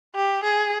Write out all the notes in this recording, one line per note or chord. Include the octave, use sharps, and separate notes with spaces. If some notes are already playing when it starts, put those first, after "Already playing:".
G4
G#4